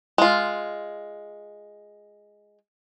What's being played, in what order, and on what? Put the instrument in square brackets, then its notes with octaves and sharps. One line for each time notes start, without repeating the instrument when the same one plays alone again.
[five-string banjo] G#3 F4